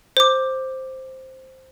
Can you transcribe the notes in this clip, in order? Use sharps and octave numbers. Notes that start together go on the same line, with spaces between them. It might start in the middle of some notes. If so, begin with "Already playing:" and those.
C5 D6